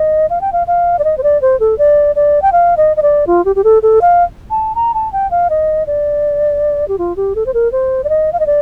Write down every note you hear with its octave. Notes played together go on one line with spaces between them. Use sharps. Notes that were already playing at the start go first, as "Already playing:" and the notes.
Already playing: D#5
F5
G5
F5
F5
D5
D#5
C5
D5
C5
A4
D5
D5
G5
F5
D#5
D#5
D5
F4
G4
G4
A4
A4
F5
A5
A#5
A5
G5
F5
D#5
D5
G4
F4
G4
A4
C5
A#4
C5
D5
D#5
F5
D#5
D5